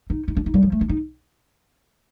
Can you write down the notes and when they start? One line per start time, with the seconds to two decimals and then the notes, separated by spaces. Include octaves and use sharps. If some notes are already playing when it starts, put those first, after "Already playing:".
0.10 D#4
0.28 D#4
0.37 D4
0.46 D#4
0.54 G3
0.63 F3
0.72 A3
0.81 D4
0.89 D#4